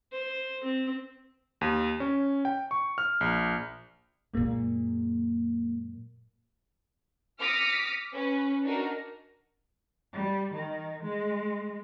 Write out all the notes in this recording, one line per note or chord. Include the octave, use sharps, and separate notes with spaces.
C5
C4
D#2
C#4
G5
C#6
F6
A#1
F#2 A#2 G#3 A#3
D6 D#6 F6 A#6 B6 C#7
C#4 B4
D4 D#4 F#4 A#4
G3
D#3
G#3